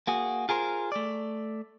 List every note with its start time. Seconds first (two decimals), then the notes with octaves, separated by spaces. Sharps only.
0.07 A#3 F#4 G#4
0.49 F4 G#4 A#4 C5
0.92 A3 D5